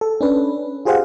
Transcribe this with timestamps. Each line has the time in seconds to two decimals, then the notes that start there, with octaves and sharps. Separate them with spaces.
0.01 A4
0.21 C#4 D4 B4
0.85 F4 G4 G#4 C5 F5 F#5